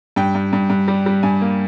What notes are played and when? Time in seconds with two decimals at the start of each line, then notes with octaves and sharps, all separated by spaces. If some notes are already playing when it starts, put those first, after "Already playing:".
0.16 G2 G5
0.35 G2
0.53 G2
0.70 G2
0.88 G3
1.06 G3
1.23 G2 G#5
1.41 A#3